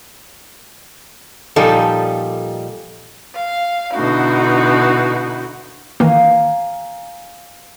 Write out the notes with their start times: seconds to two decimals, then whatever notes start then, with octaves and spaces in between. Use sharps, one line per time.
1.56 A#2 F3 G3 D#4 A4
3.33 F5
3.93 B2 D3 D#4 E4 F#4
6.00 D#3 E3 A#3 F5 G#5 A#5